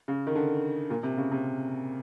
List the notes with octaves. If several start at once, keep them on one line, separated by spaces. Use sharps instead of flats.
C#3
D#3
D3
A#2
C3
C#3
C3